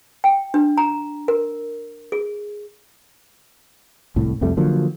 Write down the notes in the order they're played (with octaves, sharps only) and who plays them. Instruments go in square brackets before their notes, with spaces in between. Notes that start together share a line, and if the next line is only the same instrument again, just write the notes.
[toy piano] G5
D4
A#5
A#4
G#4
[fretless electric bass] C2 A2
C2 F2 G3 A3
D3 F3 F#3 A#3